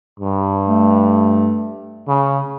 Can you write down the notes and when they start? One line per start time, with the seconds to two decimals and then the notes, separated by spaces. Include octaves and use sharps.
0.20 G2
0.68 A3
2.08 C#3